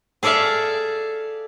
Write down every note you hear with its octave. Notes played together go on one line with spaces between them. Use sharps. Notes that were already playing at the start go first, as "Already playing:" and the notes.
G#4 A4 D5 E5 F5